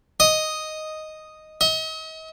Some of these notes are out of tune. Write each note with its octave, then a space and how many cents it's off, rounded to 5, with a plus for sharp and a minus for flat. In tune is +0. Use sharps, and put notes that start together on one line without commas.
D#5 +0
D#5 +40